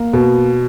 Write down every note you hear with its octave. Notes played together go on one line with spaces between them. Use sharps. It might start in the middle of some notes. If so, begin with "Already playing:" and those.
Already playing: A#3
B2